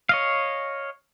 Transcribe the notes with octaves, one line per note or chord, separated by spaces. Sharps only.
C#5 D#5 F5